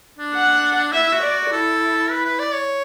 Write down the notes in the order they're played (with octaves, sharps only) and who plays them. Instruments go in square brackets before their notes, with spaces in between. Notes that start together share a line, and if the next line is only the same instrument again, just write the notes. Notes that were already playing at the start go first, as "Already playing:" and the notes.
[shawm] D4
[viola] F#5
[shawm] E4 [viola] E5
[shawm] E4
F#4
[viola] D5
[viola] E4 [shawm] A4
[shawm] B4
B4
D5
C#5